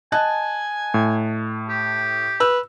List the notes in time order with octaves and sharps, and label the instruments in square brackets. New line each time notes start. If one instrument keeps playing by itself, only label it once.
[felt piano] D#5 A5 F#6 [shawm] G#5
[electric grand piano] A2
[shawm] G4
[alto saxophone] B4 [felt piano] E6